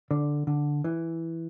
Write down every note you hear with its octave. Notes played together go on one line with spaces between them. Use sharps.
D3
D3
E3